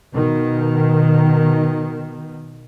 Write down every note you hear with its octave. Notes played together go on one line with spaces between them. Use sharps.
B2 D#3